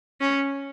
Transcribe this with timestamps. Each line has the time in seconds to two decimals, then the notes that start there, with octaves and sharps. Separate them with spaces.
0.21 C#4